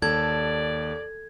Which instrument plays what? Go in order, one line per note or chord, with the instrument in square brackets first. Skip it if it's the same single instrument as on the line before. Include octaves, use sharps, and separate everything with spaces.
[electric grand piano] D#2 [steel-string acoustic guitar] A4 [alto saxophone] D5 [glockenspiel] G#6